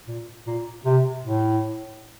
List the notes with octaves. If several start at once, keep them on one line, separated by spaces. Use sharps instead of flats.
A#2
A#2
C3
A2